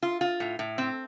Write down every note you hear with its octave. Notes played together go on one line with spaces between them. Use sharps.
F4
F4
A2
A2
C4